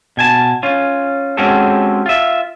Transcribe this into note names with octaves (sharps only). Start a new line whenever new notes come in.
B2 G#5 A5
C#4 F4
G#3 C4 C#4 F#4 G4 A4
F4 E5